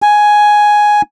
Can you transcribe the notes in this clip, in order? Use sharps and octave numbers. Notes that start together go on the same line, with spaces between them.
G#5